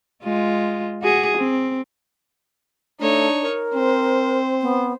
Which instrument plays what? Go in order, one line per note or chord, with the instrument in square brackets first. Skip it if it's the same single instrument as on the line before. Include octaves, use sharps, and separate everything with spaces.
[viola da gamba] G#3 F4
F#4 G#4
C4
[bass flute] A3 [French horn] D4 [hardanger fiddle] D#4 C#5
[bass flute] A#4
[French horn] C4 [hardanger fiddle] C5
[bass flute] B3